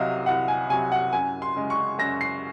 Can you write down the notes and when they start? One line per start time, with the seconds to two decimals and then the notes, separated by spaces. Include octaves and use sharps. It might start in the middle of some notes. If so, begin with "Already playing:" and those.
Already playing: C2 C3 F#3 D#5 F5
0.26 C2 F#5
0.48 G#5
0.70 C3 F#3 G#5
0.92 F#5
1.13 F#2 G#5
1.42 C6
1.56 C#3 G#3
1.70 C#6
1.99 F#2 A#6
2.21 C7